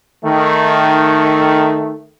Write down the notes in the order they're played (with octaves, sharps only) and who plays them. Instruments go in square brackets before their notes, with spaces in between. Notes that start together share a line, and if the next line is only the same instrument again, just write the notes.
[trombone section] D#3 A3